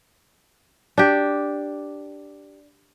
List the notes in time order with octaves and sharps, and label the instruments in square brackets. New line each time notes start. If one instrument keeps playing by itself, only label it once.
[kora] D4 G4